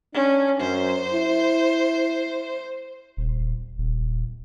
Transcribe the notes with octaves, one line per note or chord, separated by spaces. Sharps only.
C#4 D4
F#2 C5
E4
D#1
D#1